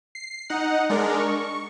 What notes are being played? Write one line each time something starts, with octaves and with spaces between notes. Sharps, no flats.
C7
D#4 F#5
G#3 D4 A#4
C#6